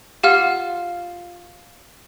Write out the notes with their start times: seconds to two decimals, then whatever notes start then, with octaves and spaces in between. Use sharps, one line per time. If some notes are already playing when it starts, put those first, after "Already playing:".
0.23 F4 G4 F#5 F6